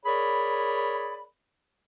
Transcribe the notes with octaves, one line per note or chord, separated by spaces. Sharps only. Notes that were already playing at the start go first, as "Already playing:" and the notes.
G#4 A#4 C#5 D5 B5